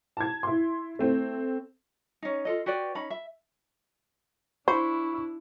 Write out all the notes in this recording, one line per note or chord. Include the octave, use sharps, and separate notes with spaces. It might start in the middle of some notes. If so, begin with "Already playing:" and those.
A5 G#6
E4 C6
A3 C4
C#4 D#4
F4 A4 D#5
F#4 G4 B4 D5
C#4 D#4 B5
E5
D4 E4 C5 B5 C#6